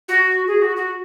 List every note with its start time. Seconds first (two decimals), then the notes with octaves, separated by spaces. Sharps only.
0.09 F#4
0.47 G#4
0.62 F#4
0.76 F#4